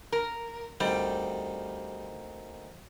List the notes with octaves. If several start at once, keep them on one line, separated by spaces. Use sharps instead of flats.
A#4
D2 D#3 G3 C4